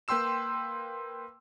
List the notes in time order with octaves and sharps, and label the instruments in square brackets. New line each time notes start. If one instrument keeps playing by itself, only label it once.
[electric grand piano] A#3 B4 G5 C6 E6 E7